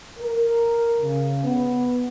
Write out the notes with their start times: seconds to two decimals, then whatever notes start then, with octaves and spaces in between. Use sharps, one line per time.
0.19 A#4
1.01 C#3
1.44 B3